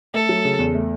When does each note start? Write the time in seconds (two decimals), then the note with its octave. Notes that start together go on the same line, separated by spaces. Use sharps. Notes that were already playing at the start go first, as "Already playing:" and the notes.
0.14 A3 A4
0.29 F#3
0.45 C#3
0.59 E2
0.74 A3